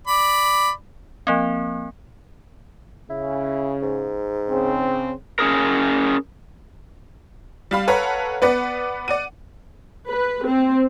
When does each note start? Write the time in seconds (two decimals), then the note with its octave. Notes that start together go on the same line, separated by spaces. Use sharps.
0.07 D5 B5
1.27 F3 A#3 C4
3.10 C#3 E4
3.82 G#2
4.49 C#3 C4
5.39 C#4 G#4 A#4
7.71 G3 F5 B5
7.87 A4 B4 C#5 F5 F#5 A#5
8.42 B3 B4 D5 F#5
9.08 D5 F#5 D#7
10.09 B4
10.48 C4